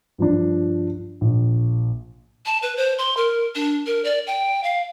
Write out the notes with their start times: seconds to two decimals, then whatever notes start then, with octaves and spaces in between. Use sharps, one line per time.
0.18 G2 F3 D4
1.21 A#1
2.46 A5
2.63 B4
2.77 C5
2.98 C6
3.17 A#4
3.55 D4
3.87 A#4
4.05 D5
4.27 G5
4.64 F5